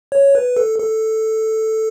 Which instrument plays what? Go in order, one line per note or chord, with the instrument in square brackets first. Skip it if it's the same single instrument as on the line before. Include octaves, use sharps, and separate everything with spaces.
[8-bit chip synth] C#5
B4
A4
A4